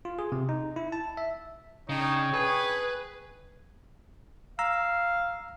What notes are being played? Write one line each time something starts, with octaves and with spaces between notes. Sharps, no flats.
F4
G#4
C3
D#4
E4
A5
E5
C#3 D4 D#4 C#5 G5
G#4 B4
F5 A#5 E6